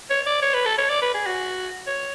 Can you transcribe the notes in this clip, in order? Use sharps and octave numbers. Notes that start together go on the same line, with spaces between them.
C#5
D5
C#5
B4
A4
C#5
D5
B4
G#4
F#4
C#5